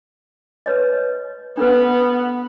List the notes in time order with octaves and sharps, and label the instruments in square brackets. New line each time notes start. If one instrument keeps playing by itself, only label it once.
[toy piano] B4 C#5 D#5
[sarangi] B3 [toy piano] D4 A4 B4